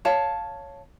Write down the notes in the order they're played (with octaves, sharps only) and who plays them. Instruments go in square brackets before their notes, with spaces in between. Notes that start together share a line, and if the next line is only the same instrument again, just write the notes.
[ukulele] C#5 F5 A5